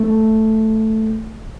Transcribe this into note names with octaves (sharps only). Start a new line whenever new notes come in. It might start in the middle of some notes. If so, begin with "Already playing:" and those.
Already playing: A3